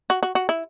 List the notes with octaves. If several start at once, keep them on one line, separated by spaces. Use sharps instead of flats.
F#4
F#4
F#4
E4